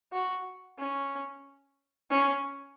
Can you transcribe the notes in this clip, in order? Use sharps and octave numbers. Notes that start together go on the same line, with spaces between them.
F#4
C#4
C#4